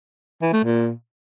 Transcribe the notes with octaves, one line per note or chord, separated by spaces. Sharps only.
E3
A3
A#2